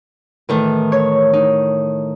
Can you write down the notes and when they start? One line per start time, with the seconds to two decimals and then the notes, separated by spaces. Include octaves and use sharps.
0.49 A2 D#3 E3
0.92 C#5
1.33 D#4